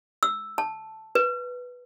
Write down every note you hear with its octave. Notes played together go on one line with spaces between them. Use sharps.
E6
A5
B4